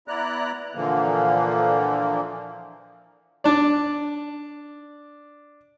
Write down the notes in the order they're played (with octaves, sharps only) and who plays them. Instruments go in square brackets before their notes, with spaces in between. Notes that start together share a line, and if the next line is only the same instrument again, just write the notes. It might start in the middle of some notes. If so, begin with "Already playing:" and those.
[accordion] B3 E4 D5 A#5 F#6
A#2 D3 E3 F3 A#3
[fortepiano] D4 D5